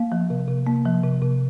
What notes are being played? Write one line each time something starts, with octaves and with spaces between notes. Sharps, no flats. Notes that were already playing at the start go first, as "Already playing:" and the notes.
Already playing: A#3 F5
F3
C3
C3
A#3
F3
C3
C3